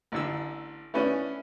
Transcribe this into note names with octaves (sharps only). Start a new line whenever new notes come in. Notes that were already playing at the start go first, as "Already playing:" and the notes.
A1 D3 E6
A3 B3 C#4 D4 E4